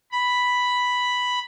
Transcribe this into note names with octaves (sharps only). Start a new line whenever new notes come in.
B5